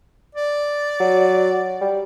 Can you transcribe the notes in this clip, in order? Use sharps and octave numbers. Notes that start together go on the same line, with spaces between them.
D5
F#3
G3